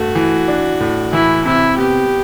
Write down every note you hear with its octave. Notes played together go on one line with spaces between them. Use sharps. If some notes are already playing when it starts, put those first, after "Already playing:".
Already playing: G2 A3 F#4
E3
D4
A2
E3 E4
C3 E4
B3 G4